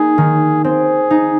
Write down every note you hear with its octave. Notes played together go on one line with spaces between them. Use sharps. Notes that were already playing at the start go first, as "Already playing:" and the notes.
Already playing: A#3 D#4 G#4
D#3
C4 G#4
D#4